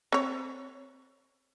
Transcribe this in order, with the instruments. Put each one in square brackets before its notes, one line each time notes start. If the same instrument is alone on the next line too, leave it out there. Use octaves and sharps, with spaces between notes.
[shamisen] C4 C#5